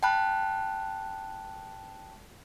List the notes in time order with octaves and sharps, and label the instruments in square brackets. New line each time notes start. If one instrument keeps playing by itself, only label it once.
[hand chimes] G5 A5 B5 F#6